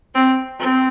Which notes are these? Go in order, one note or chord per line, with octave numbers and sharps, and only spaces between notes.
C4
C4